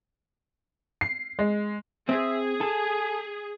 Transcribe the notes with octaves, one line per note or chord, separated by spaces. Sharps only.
C7
G#3
C4 G#4 E5
A4 G#5